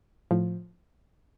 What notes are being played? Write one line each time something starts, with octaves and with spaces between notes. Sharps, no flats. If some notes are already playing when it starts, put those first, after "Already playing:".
A2 F3